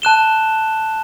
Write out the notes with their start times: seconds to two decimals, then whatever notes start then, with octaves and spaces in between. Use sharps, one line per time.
0.02 A5 F#6 E7 G7